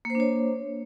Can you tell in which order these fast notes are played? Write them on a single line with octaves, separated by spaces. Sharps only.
A#3 C5 D4 C#5